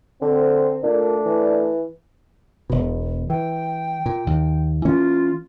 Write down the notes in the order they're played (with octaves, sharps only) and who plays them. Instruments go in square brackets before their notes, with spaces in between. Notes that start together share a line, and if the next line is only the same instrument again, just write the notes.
[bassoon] D3 [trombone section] C4
[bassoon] A#2 [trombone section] A3 D4
[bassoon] E3
[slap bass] E1 B2
[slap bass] E3 [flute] G5
[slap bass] A#2
D#2
[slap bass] E3 A#3 C#4 [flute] F4